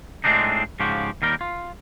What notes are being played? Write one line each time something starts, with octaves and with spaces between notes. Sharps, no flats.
A2 G#3 C4 D4 D#4
G#2 C#3 F3 F#4 G4
D#2 G3 A#4 G5
F4